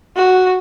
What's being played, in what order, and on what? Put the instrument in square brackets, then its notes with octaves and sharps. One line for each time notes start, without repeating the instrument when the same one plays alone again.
[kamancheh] F#4